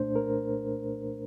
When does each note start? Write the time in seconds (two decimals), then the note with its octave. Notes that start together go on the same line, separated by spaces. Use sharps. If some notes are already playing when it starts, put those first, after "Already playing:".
Already playing: C2 A#2 A3 D4 C5
0.16 A#4